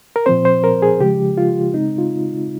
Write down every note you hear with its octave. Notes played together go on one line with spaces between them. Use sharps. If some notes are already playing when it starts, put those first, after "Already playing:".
A#4
A#2 F3 C4 C5
C5
A#4
G#4
C#3 F3 G#3 G4
F4
C#3 G#3 C4 D#4
F4